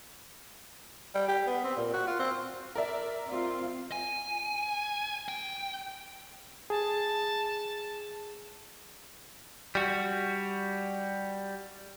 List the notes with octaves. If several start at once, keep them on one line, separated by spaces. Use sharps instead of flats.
G3
G4
B3
C4
A#2
F#4
F4
C4
A#4 D5 E5
C4 F4
G#5
G5
G#4 A5
G3 F#4